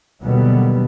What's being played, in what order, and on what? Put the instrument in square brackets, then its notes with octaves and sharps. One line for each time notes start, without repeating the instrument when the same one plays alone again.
[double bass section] D#2 B2 D3 F#3 G3 B3